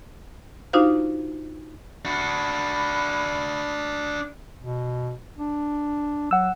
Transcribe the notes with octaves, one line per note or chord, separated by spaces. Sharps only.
D4 D#4 F4 F#4 C5 F5
D4 F#4 B5
B2
D4
F#3 F#5 E6